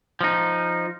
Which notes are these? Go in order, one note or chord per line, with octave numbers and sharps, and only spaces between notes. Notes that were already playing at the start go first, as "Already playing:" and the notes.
F3 D#4